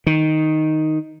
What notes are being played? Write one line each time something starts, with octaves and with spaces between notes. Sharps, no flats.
D#3